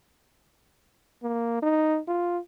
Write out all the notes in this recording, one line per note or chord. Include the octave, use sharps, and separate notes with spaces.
A#3
D#4
F4